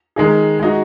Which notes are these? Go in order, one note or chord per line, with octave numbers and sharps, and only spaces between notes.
D#3 G#3 D#4 G#4
G#3 D#4 F#4